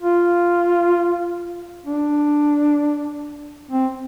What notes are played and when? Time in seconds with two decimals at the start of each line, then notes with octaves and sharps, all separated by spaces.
0.01 F4
1.86 D4
3.71 C4